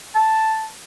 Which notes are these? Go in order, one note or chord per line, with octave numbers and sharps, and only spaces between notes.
A5